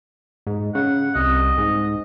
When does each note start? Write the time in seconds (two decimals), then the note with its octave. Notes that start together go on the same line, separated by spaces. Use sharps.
0.47 G#2
0.75 C#3 F#5
1.16 C2 D#5
1.58 G#2